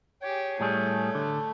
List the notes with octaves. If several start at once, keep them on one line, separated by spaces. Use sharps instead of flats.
G4 G#4 C#5
A2 G3 A3 G#4
D3